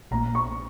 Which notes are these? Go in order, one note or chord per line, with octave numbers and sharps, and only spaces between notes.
A#1 A#2 A#3 A#5
C#6